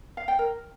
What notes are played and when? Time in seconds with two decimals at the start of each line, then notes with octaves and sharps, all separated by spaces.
0.17 F5
0.28 G5
0.39 A#4